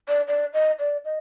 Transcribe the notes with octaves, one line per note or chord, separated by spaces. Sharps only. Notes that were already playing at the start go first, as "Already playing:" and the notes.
D5
D5
D#5
D5
D#5